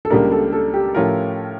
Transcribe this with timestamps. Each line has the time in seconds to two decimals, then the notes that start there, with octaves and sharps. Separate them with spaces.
0.05 A4
0.10 C#2 C#3 G3 A#3 D4 A#4
0.32 A4
0.52 A4
0.74 G4
0.95 A2 F3 C#4 F4 A#4